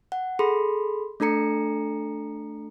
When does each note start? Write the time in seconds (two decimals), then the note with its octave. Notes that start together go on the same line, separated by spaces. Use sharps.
0.12 F#5
0.39 G#4 A4 B5 C6
1.20 A3 D4 A4 A#5 C#7